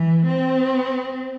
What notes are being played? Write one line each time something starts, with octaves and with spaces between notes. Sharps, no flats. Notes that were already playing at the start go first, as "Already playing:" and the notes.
Already playing: E3
C4